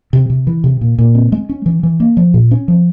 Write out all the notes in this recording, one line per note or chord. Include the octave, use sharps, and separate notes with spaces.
C3
C3
E3
C3
A#2
A#2
C4
G#3
C#4
E3
E3
A#3
F3
A#2
C#4
F3